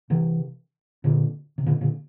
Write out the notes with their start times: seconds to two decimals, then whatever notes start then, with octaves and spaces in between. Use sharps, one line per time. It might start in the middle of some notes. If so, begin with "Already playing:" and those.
0.10 C3 E3
1.04 A#2 D3
1.58 C3
1.66 A#2 D3
1.81 A#2 D3